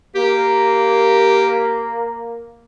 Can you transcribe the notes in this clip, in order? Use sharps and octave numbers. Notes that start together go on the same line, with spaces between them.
A#3 G4